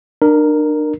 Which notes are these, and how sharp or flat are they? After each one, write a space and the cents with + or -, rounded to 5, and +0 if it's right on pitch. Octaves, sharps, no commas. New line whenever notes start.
D4 +35 A#4 +0